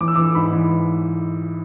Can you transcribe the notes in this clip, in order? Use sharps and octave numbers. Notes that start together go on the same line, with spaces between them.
E3 D6
E6
E3 D6
G#2 B5
E3